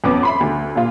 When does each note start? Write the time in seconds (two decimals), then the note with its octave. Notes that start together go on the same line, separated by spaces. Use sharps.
0.04 F2 B3 C#4 D6
0.23 E5 B5 C6
0.40 D2
0.76 A#2 F4